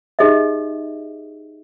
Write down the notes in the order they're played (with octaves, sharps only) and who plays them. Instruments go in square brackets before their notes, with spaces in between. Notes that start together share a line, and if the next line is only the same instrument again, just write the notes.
[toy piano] D#4 G4 G#4 D#5 E5